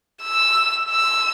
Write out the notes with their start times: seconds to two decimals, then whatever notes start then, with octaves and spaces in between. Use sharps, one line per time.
0.23 E6
0.91 E6